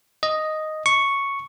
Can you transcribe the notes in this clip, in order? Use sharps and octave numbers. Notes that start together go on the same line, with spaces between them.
D#5
C#6